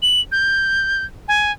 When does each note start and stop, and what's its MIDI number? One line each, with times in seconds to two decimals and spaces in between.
0.02 0.21 102
0.32 1.04 91
1.28 1.52 80